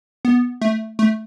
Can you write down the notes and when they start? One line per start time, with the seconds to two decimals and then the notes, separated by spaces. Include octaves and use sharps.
0.25 B3
0.62 A3
0.99 A3